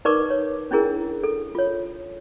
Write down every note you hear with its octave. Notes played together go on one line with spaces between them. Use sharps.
D#4 A#4 B4 D5 C#6 D6
C#5
C#4 D4 E4 G#4 A#4
A4
F4 C#5